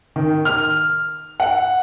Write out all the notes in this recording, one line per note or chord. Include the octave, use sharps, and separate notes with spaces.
D#3
F6
F#5